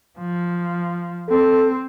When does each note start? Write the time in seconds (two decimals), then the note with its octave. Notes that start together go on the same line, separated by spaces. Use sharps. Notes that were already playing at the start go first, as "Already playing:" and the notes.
0.19 F3
1.30 C4 A4